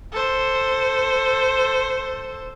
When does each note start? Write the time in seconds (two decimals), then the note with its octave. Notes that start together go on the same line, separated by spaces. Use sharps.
0.13 A4 C5